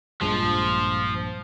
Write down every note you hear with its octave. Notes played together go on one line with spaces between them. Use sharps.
A#1 G2 F3 G#3